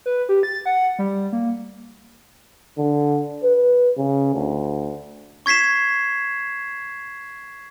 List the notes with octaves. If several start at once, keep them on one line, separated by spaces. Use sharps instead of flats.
B4
G4
A6
F#5
G3
A#3
D3
B4
C#3
D2
C#6 G#6 B6 C7 E7